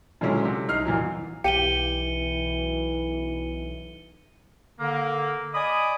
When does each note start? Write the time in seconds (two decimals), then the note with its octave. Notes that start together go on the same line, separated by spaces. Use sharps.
0.21 A#2 D3 F#3 G#3 C#4 E4
0.45 C3
0.68 C2 D#4 F6 C7
0.85 E2 A#2 E3 F#3
1.44 B1 E3 G4 C#7 D#7 G7
4.80 D3 A#3
5.55 D5 D#5 G#5 B5 D6 D#6